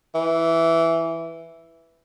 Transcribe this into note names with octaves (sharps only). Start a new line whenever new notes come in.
E3